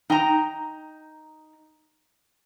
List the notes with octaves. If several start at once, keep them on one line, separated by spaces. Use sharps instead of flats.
D#4 G5 A#5